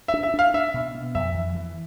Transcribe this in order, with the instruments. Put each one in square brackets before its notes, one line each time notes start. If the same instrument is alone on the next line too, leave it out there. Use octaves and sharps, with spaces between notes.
[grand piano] E5
[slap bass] D4
[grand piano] E5
[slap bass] D4
[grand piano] F5
[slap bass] D4 [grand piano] E5
[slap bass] B2
B3
[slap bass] F2 [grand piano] E5
[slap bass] E3
E3